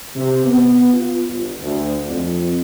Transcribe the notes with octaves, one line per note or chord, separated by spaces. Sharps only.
C3
B3
F4
G1
D2
F2